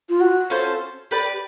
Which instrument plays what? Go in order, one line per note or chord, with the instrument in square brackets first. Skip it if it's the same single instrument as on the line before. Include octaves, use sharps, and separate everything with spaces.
[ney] F4
F#4
[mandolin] C#4 F4 A4 C5
G4 B4 D5